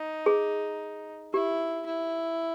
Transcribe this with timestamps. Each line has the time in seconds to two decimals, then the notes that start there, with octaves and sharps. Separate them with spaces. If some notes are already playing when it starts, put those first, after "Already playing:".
Already playing: D#4
0.26 G#4
1.34 E4 G4
1.86 E4